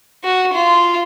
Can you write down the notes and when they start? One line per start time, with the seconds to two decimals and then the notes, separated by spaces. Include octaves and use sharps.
0.24 F#4
0.54 F4